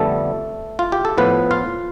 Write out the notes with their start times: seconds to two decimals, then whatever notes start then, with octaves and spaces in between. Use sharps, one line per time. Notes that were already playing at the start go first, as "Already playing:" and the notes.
Already playing: F2 D3 G3 A3 B3 A4
0.79 F4
0.92 G4
1.05 A4
1.18 A2 F3 B3 B4
1.51 F4 F5